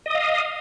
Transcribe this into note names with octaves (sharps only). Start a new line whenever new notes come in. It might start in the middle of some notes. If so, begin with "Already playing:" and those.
D#5 F5 D#6